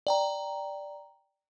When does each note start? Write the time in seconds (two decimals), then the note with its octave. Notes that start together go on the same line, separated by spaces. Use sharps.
0.07 D5 G5 A#5